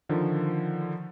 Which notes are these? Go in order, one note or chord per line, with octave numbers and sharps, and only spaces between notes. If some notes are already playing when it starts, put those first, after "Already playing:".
D3 D#3 F3